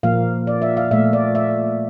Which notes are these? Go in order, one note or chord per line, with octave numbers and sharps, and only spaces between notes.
A#2 F3 A#3 F5
D5
E5
F5
A#2 A3 E5
D5
E5